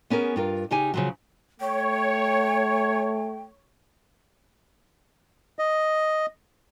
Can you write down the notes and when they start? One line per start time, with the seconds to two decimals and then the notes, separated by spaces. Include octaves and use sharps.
0.10 B3 C#4 G#4 A#4
0.36 G2 F4 A#4
0.71 C#3 D#4 G4 G#5
0.94 C#3 F3 F#3
1.60 A3 C#5 G5
5.59 D#5